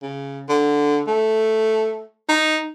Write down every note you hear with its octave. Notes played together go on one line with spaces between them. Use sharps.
C#3
D3
A3
D#4